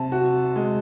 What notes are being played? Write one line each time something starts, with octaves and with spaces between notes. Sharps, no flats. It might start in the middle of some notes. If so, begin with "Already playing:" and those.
Already playing: C3 A5
F#4
G#3